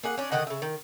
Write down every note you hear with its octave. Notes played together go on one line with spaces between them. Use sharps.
A#3 G#4 F#5
C#4 D4
D3 D#3 D#5 F#5
C#3 E5
D#3